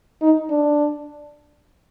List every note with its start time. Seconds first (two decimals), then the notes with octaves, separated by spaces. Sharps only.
0.22 D#4
0.50 D4